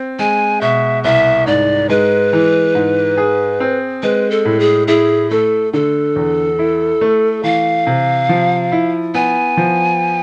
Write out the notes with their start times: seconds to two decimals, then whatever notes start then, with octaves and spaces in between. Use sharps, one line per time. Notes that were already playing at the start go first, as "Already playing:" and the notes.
Already playing: C4
0.19 G#3 G#5
0.61 B2 E5
1.04 C2 E5
1.47 G#2 D5
1.89 G#3 B4
2.33 E3
2.75 G#2
3.17 G#4
3.60 C4
4.03 G#3 B4
4.31 A4
4.45 A2
4.60 G#4
4.88 E4 G#4
5.30 A3 A4
5.73 D3 A4
6.16 E2
6.59 E4
7.01 A3
7.43 E3 F5
7.87 C3
8.29 F3
8.72 E4
9.14 B3 G#5
9.57 F3